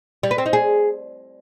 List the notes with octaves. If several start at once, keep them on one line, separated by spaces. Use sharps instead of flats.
G3
B4
C4
D#4
G#4